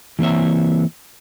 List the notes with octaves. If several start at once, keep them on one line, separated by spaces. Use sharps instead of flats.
E3 A#3 C4 C#5 E5